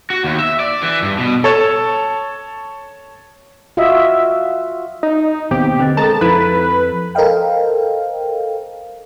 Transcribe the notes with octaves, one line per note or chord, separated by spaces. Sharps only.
F#4
D#2
E5
D5
E3
G2
B2
A4 C#5 A5
F4 F#4 D#5 E5
D#4
D#2 B2 C4 G4
D3 C4 B4 C5 D#5
G#3 A4 A#4 A5 A#5
F2 E4 B4
A4 A#4 C5 D#5 F5 G5